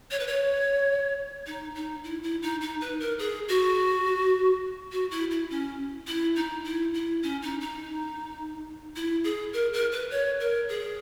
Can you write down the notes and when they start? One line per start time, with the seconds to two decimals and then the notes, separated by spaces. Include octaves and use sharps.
0.11 C#5
0.20 B4
0.27 C#5
1.47 D#4
1.75 D#4
2.04 E4
2.23 E4
2.42 D#4
2.61 D#4
2.81 B4
3.00 A#4
3.19 G#4
3.48 F#4
4.92 F#4
5.11 E4
5.31 E4
5.50 C#4
6.07 E4
6.36 D#4
6.65 E4
6.94 E4
7.23 C#4
7.42 D#4
7.61 D#4
8.96 E4
9.24 G#4
9.53 A#4
9.73 A#4
9.92 B4
10.11 C#5
10.40 A#4
10.69 G#4